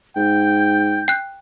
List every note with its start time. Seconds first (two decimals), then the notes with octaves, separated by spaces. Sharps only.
0.16 G#2 G5 G6
1.08 G5 F#6